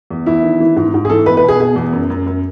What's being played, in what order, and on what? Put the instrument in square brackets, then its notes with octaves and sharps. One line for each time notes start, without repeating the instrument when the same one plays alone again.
[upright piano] E2
E2 E4
D#3
E3
G#2
G#2
G#4
E3 A4
E2 B4
B4
B2
G#4
B2 G#4
E2
F#2
F#2
F#2